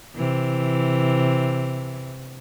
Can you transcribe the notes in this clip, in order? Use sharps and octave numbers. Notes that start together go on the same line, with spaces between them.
C3 E3